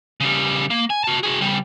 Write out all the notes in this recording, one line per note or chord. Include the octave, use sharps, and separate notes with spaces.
C#3 G3
A#3
G#5
F#4 A5
F#4 G#4
C#3 G3